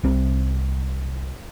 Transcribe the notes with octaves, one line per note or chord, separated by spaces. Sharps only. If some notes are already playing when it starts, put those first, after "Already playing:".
C2 C4